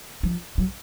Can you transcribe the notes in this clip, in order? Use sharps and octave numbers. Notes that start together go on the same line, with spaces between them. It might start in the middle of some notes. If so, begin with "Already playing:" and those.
F3
F#3